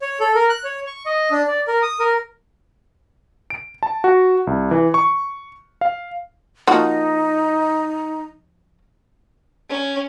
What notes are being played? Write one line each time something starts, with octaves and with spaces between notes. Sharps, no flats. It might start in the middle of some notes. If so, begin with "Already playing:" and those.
C#5
A4
A#4
F#6
C#5
C#6
D#5
D4
D5
A#4
D#6
A#4
D7
A5
F#4
C2
E3
C#6
F5
F3 A#3 D#4 F#4
C#4